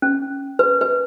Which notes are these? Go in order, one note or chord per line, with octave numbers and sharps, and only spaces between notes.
C#4
B4
B4